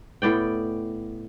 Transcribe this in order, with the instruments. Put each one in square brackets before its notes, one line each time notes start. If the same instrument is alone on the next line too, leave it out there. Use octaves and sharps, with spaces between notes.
[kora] A2 B3 D5 G5